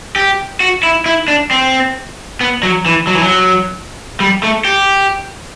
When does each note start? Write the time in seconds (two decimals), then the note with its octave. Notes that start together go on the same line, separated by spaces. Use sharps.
0.16 G4
0.60 F#4
0.83 E4
1.06 E4
1.28 D4
1.51 C4
2.41 B3
2.63 F#3
2.86 E3
3.07 F#3
3.15 E3
3.23 F#3
4.20 G3
4.43 A3
4.65 G4